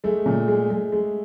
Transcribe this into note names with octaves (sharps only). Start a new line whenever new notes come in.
G#3 A3
A#2
G#3
G#3
G#3